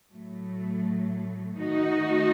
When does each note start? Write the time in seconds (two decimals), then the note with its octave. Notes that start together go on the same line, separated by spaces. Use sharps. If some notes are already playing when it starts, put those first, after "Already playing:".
0.12 A2 F#3 A3
1.59 D#3 A3 D#4 F#4